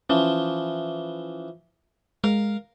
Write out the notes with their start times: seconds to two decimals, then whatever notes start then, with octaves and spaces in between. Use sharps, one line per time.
0.10 E3 F3 C#4
2.24 G#3 A#4 F5